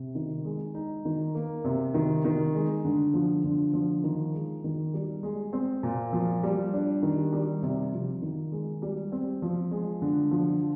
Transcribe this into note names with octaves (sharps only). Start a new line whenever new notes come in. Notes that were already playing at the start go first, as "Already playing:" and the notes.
Already playing: C3
D#3
G#3
D#4
D#3
A#3
C3
D#3
D#3
G#3
D3
F3
D3
F3
D#3
G#3
D#3
G3
G#3
C4
A#2
F3
G3
D4
D#3
G3
C3
F3
D#3
G#3
G3
C4
F3
G#3
D3
F3